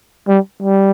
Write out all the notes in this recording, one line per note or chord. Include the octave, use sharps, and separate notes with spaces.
G3
G3